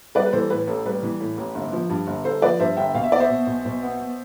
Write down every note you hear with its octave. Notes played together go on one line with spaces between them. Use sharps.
G3 B4 D5
B4
E3 A4 C5
A2 B4
A1 A4
G3 B4
E3
A2
A1
G1
F3
G2
G1
G1 A4 C5
F3 B4 D5
G2 C5 E5
G1 E5 G5
B1 F5
E5
B3 D5
C5 E5
B2
B1
B1
B3
B2